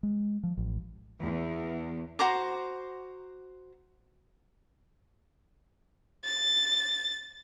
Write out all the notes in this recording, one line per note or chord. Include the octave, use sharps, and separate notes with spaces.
G#3
F3
A1
E2
F#4 C5 A#5 D6
A6